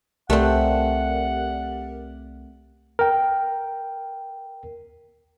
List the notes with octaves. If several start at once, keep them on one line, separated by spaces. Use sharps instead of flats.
C2 A3 C4 G4 A#4 D5 F#5
A#4 G5